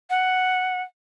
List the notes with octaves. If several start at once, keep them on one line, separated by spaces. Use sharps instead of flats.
F#5